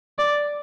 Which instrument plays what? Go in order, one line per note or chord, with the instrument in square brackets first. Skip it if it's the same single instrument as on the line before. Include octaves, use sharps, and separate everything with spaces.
[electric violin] D5